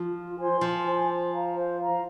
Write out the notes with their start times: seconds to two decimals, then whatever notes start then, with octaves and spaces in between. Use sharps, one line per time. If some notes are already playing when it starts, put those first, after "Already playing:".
Already playing: F3
0.14 F4
0.38 C5 G#5 C6
0.61 F3 F4
0.85 C5 G#5 C6
1.07 C5
1.32 F5 A#5
1.54 C5
1.78 F5 A#5